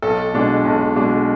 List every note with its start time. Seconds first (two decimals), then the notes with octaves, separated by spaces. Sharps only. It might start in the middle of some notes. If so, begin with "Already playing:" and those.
0.02 B1 A4
0.34 B2 G#3 D4
0.65 B1
0.95 B2 G#3 D4